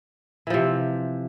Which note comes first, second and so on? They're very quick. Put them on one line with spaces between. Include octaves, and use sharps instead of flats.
E3 F3 C3